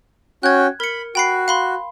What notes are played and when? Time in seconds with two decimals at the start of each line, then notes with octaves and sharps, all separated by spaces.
0.43 C#4 F#4 G5 F#6 G#6
0.80 A#4 B5 C#7
1.15 F#4 G5 B5 C7
1.48 F5 B5 C6